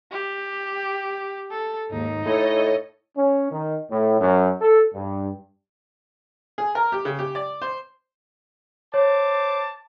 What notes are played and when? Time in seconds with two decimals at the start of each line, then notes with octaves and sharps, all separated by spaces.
0.11 G4
1.51 A4
1.91 D#2 G#2 D#4
2.25 A2 A4 C#5 D#5
3.17 C#4
3.51 D#3
3.91 A2
4.20 F#2
4.62 A4
4.95 G2
6.58 G#4
6.75 A#4
6.92 G4
7.05 C#3
7.19 G4
7.35 D5
7.62 C5
8.94 C5 C#5 A5 D6